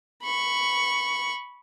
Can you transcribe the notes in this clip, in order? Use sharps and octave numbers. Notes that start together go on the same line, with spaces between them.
B5 C#6